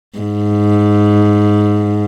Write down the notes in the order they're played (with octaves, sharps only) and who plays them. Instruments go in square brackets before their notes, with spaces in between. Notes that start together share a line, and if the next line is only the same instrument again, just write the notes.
[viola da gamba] G#2